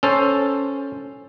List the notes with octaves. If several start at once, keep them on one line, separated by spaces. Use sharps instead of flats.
C#4 A4 C5